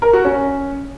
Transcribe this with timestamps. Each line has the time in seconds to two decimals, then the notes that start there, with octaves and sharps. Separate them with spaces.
0.02 A#4
0.13 F#4
0.25 C#4